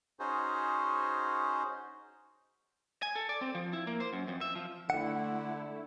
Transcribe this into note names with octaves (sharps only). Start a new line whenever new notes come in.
C#4 D#4 F#4 G#4 C5
G#5
A4
D5
C4
F3
E4
A#3
C5
F#2
F2
E5
F3
D3 A3 E4 F#5